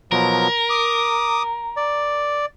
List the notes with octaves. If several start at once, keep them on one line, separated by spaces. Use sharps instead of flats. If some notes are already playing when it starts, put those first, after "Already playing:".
B2 F3 F#3 A#4
D6 D#6
D5